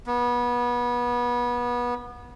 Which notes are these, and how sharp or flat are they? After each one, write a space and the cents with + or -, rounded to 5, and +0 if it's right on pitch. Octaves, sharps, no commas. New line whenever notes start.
B3 -25